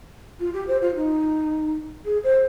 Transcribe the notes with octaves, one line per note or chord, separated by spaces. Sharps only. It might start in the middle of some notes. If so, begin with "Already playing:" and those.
F4
G4
C5
F4
D#4
G#4
C5